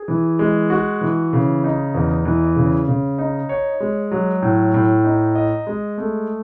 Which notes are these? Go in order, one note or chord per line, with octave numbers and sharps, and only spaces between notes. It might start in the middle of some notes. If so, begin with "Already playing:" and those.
Already playing: G#4
E3
G#3
F#4
E3
C#3
D#4
E2
E3
C#3
C#3
D#4
C#5
G#3
F#3
A2
A2
D#4
D#5
G#3
A3